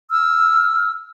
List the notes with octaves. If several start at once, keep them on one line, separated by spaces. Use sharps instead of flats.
E6 F6